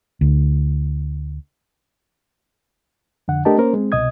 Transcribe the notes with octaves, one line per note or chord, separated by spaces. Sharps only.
D2
F2 D3 F#5
A3 D4 G4 A#4 D#5 A5
A#3 C#4 A#4 C5
G#3 C4
C2 B2 D#5 D#6 G#6